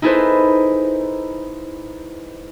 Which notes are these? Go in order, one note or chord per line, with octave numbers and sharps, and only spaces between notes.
D#4 E4 G#4 A4 B4 C5